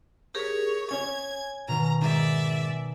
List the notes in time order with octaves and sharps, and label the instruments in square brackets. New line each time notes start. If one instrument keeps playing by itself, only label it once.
[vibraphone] G4 G#4 A#4 [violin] C#5 [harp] D#6 B6
[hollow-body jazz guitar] C#4 C#5 [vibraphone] G#5 [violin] G#6
[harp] B2 D#3 [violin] A#5
[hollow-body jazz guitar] G#2 D#3 [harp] D#4 [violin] D5 E5